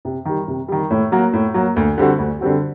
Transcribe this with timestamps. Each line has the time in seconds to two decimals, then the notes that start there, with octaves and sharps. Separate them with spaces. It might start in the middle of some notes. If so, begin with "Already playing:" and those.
0.05 C3
0.25 D#3 G3
0.48 C3
0.68 D#3 G3
0.91 A2
1.12 F#3 A#3 F#4
1.33 A2
1.54 F#3 A#3 F#4
1.76 D2
1.98 D3 G3 C4 F#4
2.19 D2
2.41 D3 G3 C4 F#4